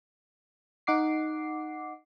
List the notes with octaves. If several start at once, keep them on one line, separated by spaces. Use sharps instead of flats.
D#4 F#5 D6 C7